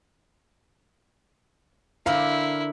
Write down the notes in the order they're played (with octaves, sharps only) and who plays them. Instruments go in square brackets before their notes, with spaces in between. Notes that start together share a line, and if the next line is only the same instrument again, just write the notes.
[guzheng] D3 A#4 C5 [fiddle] E4 [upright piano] F5